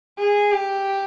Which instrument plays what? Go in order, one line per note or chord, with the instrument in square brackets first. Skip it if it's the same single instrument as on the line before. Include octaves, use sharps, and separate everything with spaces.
[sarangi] G#4
G4